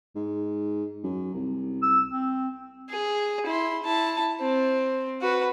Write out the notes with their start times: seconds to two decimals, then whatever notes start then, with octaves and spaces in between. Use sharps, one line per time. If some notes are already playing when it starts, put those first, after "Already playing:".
0.16 G#2
1.04 F#2
1.34 C2
1.83 E6
2.11 C4
2.89 G#4
3.46 E4 C6
3.83 E4 A5
4.41 C4
5.21 F#4 B4